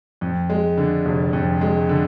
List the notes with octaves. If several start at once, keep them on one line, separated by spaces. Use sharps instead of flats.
F2
G#3
D3
F1
F2
G#3
D3